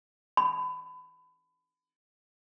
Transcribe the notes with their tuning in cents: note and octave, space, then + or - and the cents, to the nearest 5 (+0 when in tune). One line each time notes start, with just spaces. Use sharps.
B5 +30